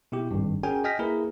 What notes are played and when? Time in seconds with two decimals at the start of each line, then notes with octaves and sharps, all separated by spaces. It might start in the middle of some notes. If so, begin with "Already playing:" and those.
0.12 B2 E4 G4
0.31 G#1 G2
0.63 C#4 F#4 G#4 A#4 G5 G#5
0.84 D#5 G5 G#5 F6 A#6 B6
0.99 A#3 E4 G#4 A#4 B4